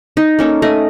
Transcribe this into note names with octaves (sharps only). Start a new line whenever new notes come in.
D#4
A#3 C#4 A4
A3 D#5